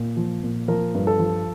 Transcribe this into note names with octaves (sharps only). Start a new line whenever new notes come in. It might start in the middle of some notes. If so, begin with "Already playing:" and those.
Already playing: A#2
F3
A#2
F3 A#4
G2
A4
F3